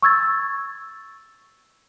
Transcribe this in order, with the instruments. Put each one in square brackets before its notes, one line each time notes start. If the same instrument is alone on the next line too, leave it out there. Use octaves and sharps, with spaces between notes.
[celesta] C#6 E6 G#6 A6